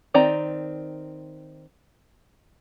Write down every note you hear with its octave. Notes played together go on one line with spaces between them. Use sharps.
D#3 C4 D5 A#5